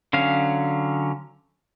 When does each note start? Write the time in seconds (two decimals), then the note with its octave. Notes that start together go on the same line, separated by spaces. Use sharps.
0.13 D3 F#3 C#4 F5